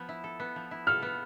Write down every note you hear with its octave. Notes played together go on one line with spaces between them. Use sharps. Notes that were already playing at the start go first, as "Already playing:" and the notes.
Already playing: F3 B3
E4
A4
B3
F3
E4
A4 F6
B3